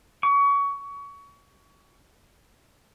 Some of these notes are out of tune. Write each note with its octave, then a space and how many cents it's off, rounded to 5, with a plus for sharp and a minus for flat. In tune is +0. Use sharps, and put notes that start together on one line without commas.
C#6 +25